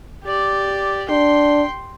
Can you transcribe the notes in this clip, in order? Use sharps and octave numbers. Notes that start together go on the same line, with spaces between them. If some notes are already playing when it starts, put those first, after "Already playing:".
G4 D5
D4 G5 C6